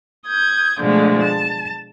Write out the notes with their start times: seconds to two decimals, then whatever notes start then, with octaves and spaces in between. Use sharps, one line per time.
0.25 D#6 G6 G#6
0.79 B2 D3 F3 G#3 A3
1.23 A5